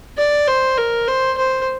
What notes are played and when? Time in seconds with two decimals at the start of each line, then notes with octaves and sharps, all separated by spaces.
0.18 D5
0.48 C5
0.78 A#4
1.08 C5
1.37 C5